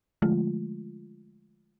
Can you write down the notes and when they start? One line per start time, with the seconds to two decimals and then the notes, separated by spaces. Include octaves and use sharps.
0.22 D3 F3 G#3 A3 F4